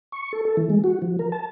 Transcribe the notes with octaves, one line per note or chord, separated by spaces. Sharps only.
C#6
A4
A4
E3
G#3
F#4
F3
A#4
A5